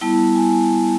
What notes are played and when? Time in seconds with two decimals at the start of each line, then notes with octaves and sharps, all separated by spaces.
0.01 G3 B3 E4 A5
0.35 G#5